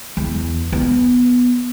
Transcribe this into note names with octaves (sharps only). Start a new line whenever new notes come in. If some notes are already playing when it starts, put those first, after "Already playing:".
E2
B3